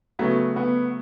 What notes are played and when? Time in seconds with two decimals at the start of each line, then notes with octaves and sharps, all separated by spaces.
0.19 C#3 F#3 A3 B3 F#4
0.56 B3